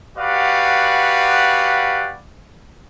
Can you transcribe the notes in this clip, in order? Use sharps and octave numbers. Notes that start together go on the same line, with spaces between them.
F#4 G4 B4 D5 F5 F#5